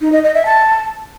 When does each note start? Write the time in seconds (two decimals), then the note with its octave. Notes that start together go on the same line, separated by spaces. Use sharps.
0.01 D#4
0.12 D#5
0.23 D#5
0.34 E5
0.45 A5